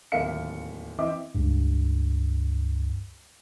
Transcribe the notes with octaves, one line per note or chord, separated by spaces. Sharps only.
D1 D#2 A#4 E5 F5 C#7
E3 C4 D#5 E5 D6
C#2 G2